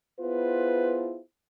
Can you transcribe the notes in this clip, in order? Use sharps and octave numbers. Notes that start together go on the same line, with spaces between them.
B3 E4 F4 G#4 B4 C5